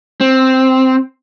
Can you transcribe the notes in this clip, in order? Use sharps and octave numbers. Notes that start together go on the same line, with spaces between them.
C4